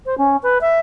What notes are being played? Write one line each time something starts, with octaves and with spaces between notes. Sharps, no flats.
C5
C#4
B4
E5